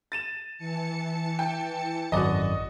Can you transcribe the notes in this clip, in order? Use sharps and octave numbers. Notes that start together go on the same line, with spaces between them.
A6 D#7 E7
E3 A5 C#7
G5
G#1 F#2 F#4 D5 D#5